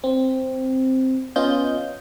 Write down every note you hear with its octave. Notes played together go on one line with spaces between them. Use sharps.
C4
B3 C#4 F4 D#5 G6